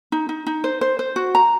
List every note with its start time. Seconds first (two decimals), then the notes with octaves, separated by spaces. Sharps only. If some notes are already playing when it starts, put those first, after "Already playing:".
0.12 D#4
0.29 D#4
0.47 D#4
0.64 C5
0.81 C5
0.99 C5
1.16 F#4
1.35 A#5